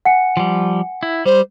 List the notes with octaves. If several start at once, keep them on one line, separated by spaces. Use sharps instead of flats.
F#5 G#5 C#7
F3 G3
E4
G3 C5